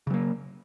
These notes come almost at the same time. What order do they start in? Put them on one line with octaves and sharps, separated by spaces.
C#3 F#3 A#3